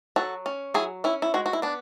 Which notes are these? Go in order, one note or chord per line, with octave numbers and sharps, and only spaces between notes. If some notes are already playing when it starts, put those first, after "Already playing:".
F#3 F#4 A4
C#4
F#3 E4 G#4
C#4 E4
E4
G#3 F#4
F#4
E4
B3 D4